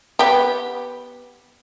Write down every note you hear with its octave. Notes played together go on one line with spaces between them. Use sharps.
B3 G4